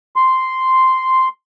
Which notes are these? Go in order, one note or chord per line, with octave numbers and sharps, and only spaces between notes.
C6